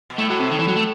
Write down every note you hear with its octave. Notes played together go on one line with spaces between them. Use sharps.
B2
A2 A3
F#3
C3
D#3
E3
F#3
A3